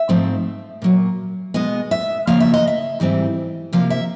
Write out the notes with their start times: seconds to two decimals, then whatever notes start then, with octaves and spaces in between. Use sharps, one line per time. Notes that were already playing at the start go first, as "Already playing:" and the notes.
Already playing: E5
0.09 G#2 F3 A3 C4
0.82 A#2 F#3 A#3
1.54 B2 G#3 B3 D#5
1.91 E5
2.27 F2 C#3 F3 A#3 F5
2.40 E5
2.54 D#5
2.67 E5
3.00 G#2 E3 G3 C4
3.73 C3 F3 A#3 F5
3.90 E5